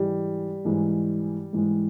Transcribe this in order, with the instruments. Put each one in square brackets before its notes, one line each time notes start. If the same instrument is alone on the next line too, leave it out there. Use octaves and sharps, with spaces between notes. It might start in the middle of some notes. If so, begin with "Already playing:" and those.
Already playing: [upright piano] G#2 E3 G#3 [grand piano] G3
[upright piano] G#2 E3 G#3
G#2 E3 G#3